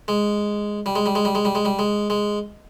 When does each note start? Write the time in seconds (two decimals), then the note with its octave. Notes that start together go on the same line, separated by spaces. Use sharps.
0.08 G#3
0.86 G3
0.96 G#3
1.06 G3
1.15 G#3
1.25 G3
1.35 G#3
1.45 G3
1.55 G#3
1.65 G3
1.79 G#3
2.10 G#3